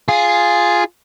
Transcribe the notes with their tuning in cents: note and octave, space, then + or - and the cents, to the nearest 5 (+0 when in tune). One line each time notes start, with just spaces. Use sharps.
F4 +0 G#4 +0